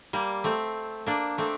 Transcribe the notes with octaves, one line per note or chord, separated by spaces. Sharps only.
G3 A#3
A3 C4
A#3 D4
A3 C4